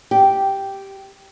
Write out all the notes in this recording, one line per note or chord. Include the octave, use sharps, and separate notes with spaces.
G4